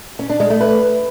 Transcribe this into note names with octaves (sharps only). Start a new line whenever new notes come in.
C#4
D4
G#3
A3
B4